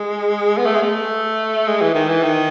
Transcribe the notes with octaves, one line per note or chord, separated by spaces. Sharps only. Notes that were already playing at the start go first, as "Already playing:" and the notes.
Already playing: G#3
B3
A3
G#3
A3
G#3
E3
D#3
E3
D#3